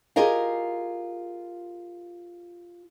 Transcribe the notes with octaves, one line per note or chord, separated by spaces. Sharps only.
F4 G4 G#4 A#4 D#5 F5